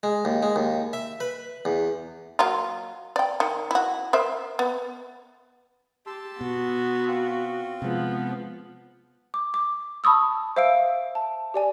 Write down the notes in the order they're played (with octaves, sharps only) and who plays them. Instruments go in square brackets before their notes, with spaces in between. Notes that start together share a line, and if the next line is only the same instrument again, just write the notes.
[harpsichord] G#3
D#2
G#3
D#2
E5
B4
E2
[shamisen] F#3 A#3 F4
D5 G5
D#3
E4 F#4
A#4 C5 E5
B3
[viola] G4 [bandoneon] A5 C6 E6
[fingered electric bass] B2 [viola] B3 [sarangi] F#4
[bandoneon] C4 F4
[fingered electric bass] C3 G#3 [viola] F3 [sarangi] B3
[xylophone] D6
D6
A5 B5 C#6 D#6 E6
C5 E5 F5 E6 D7
A5
G4 D5 G#5